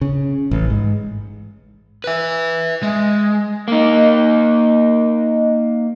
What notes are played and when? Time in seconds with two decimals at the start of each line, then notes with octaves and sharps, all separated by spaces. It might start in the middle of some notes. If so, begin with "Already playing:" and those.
0.01 C#3
0.51 A1
0.70 G#2
2.04 B4 E5
2.83 G#3
3.68 A#3 D#4